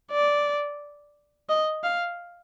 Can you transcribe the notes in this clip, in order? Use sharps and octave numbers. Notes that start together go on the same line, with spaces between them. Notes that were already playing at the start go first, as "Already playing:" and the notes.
D5
D#5
F5